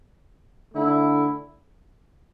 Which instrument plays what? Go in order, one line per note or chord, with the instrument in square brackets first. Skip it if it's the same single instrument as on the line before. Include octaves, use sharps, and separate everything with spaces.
[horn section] D3 A3 E4